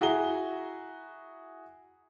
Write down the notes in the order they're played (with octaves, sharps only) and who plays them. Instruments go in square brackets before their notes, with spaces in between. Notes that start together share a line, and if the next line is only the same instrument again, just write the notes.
[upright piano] E4 F#4 G#4 A#5 G7